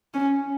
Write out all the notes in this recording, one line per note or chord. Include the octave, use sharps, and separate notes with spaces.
C#4